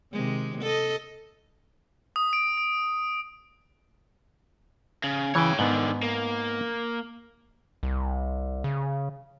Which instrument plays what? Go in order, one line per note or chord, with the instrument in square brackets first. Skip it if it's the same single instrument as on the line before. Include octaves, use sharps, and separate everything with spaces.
[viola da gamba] C3 D#3 G#3
A4 D#5
[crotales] D#6
D7
D7
[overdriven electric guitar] C#3
[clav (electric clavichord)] C#3 E3 [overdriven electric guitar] C#5 G5
[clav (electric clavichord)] G#2 B3 [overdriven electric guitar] D3 D#3
[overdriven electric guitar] A#3
[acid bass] C2
C#3